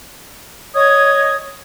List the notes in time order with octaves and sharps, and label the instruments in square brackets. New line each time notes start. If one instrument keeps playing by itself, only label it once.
[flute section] C#5 D#5 D#6 G#6